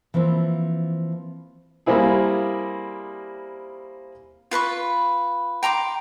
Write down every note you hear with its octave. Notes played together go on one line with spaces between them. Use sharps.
E3 F3 A#3 C4
G3 A#3 C4 E4 G#4
F4 B4 B5 C#6
G5 A#5 C6 D6